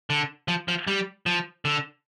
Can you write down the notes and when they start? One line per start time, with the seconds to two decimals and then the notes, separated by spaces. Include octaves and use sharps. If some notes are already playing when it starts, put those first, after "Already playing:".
0.10 D3
0.48 F3
0.68 F3
0.87 G3
1.26 F3
1.65 D3